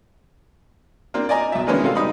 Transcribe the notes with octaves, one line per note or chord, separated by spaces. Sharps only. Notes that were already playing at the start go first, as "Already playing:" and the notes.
A#3 C4 D4
D5 D#5 G#5 A#5
B1 E5
D#3 G#3 A#3 B3 C#4 D4
C3 A4 F5
G3 D#4 B5 D#6